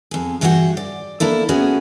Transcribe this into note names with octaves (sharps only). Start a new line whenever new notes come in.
F2 G#4
G2 E3 F#4 G#4 F#5 G5
D5
A#3 D4 E4 A4
A3 B3 C#4 F#4 G#4